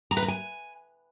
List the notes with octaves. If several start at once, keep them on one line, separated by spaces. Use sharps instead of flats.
A#5
B4
A#5
G#5